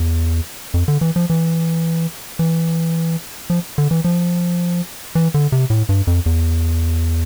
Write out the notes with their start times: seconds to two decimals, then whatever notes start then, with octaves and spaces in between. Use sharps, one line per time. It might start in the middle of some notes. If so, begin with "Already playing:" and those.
Already playing: E2
0.74 F2
0.88 D3
1.01 E3
1.16 F3
1.30 E3
2.39 E3
3.50 F3
3.78 D3
3.91 E3
4.04 F3
5.15 E3
5.34 D3
5.52 C3
5.70 A2
5.89 G2
6.07 F2
6.26 E2